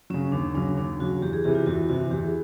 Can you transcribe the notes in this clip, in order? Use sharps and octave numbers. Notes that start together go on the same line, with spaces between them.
C#3 F#3 C#4
D#2 D4
C#3 F#3 D4
D#2 D4
C#3 F#3 F#4
E2 G4
G#4
C3 E3 G4
F4
E2 F#4
C3 E3 F#4
E2 G4
G#4